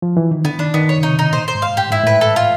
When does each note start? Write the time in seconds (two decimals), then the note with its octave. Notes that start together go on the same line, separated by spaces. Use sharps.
0.02 F3
0.17 E3
0.31 D#3
0.45 D3 B3
0.59 D#3 D4
0.74 D#3 B3
0.89 C#5
0.98 C#3
1.03 C3 D#4
1.18 B2 D#4
1.32 A#2 C5
1.48 C5
1.55 G#2
1.62 F5
1.77 A2 G4
1.90 G#2 E4
2.03 A2 B4
2.21 A4
2.36 F4